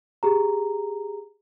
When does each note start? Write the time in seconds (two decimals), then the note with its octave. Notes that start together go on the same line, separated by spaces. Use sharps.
0.23 G4 G#4 A#5